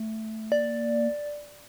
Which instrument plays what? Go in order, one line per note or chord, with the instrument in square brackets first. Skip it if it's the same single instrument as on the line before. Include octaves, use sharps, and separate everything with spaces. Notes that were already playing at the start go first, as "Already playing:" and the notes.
Already playing: [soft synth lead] A3
[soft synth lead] A#3 [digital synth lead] D5